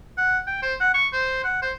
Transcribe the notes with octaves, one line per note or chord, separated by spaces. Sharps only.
F#5
G5
C5
F#5
C#6
C5
F#5
C5